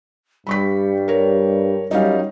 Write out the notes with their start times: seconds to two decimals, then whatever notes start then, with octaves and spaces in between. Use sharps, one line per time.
0.47 G2 G3 B5 C#6 B6
1.08 A#4 C#5
1.91 F#2 G3 D#4 C#5 F5